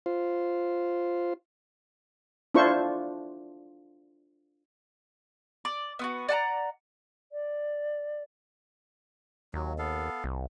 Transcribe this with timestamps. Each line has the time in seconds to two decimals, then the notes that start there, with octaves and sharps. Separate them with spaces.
0.06 F4 C5
2.54 D4 E4 F4 C5 C#6
5.65 D5
5.99 B3 F4 F#4
6.29 D5 F#5 A5 A#5
7.32 D5
9.54 D#2 F#3
9.78 B3 A4 F5
10.24 C2